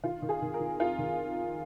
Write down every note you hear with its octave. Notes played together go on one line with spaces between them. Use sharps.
D#3 F4
D#3
G#4
D#3
A#4
D#3
F2 F4
D#3